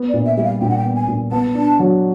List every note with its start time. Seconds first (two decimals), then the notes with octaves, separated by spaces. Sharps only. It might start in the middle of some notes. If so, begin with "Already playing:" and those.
Already playing: B3
0.09 D5
0.14 A#2
0.26 E5
0.37 G3 E5
0.43 F5
0.61 A#2 G5
0.69 F#5
0.78 G5
0.85 B3
0.96 G#5
1.08 A#2
1.32 B3 A5
1.55 D4
1.79 F#3